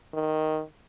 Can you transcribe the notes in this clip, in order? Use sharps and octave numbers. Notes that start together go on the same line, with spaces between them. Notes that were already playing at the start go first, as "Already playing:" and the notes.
D#3